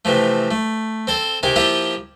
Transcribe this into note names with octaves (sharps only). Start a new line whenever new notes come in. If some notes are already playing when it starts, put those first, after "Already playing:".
C3 E3 F3 A3
A3
C4 A4 C5
C3 D#3 G4 G#5
F3 A#3 E4 F4 G4 E5